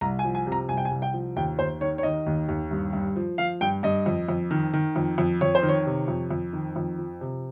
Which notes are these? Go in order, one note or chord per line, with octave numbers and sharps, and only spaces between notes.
C2 A#5
G#5
F3
G#5
C3
A#5
C2 G#5
G5
G#5
C2
G5
F3
D#2 G5
D#2 C5
D#3 C#5
C#5
D#3 D#5
D#2
D#2
G2
G2
F3
F3 F5
G2 G5
G2 D#5
F2
F2
D#3
D#3
F2
F2
F2 C#5
C5
D#3
C#5
C3
F2
F2
D#3
F2
F3
C3